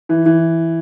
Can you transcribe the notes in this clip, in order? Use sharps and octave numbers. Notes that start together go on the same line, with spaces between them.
E3
E3